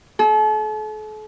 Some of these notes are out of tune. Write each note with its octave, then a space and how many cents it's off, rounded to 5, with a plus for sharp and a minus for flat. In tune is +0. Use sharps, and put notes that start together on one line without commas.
A4 -40